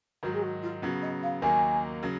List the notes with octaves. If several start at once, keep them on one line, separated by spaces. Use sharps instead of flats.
G#2 D#3 F#3 F#4
G#4
F#4
F4
C#3 F#3 B3 F4
D#5
F5
D#2 D#3 F#3 A#3 G#5
C#3 F#3